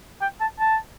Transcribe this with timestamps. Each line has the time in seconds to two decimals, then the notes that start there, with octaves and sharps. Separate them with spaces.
0.21 G5
0.41 A5
0.59 A5